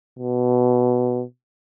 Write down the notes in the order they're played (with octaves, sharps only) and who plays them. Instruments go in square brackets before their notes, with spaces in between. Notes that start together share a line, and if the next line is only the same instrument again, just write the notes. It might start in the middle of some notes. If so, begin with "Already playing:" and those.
[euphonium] B2